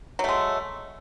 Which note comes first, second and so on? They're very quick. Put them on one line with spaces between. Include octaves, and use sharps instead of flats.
F#3 A3 G#3